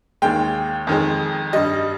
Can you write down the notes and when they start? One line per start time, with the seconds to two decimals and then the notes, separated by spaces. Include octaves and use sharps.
0.22 D#2 D#3 G#3 G5
0.87 F2 D#3 G#3
1.53 G2 G3 D#5